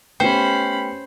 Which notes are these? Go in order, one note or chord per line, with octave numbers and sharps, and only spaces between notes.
A3 B3 C#4 G4 C5 G5 B5